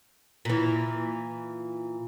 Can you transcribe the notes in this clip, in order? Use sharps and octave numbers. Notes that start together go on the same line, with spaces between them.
A#2 E3